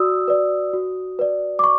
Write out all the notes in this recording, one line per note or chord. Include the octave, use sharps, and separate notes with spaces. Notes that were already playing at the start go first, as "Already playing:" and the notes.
Already playing: F#4 D5 D#6 E6
B4 D5
F#4
B4 D5
D6
C#6